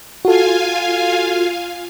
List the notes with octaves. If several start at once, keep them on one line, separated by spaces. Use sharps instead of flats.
F4 F#4 A4 F5 G#5